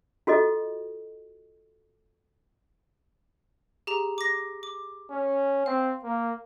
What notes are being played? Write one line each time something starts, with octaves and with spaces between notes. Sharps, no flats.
F4 F#4 A4 D#5
G4 G#4 A#5
D6 A#6
D6
C#4
C4 F5
A#3